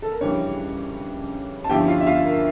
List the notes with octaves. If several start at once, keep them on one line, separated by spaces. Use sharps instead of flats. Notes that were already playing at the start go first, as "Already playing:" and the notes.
A4
A#4
F2 C#3 E3 G3 C#4 D4 C#5
A5
G1 G2 F3 C#4 E4 G4 G5
F4 F5
E5
F4 F5
A#4